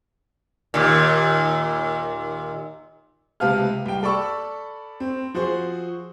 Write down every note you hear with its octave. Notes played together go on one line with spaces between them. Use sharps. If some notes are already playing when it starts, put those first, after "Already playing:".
D#2 A#2
C#2 C3 B4 F5 A5 F6
C2 G5
A4 D5 B5 C#6 E6
C4
F3 F#4 G#4 C5